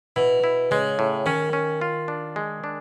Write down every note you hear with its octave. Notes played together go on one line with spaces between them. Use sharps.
B2 E4
E4
C#3 G#3
A2
D#3 C#4
C#4
F4
D4
G#3
D4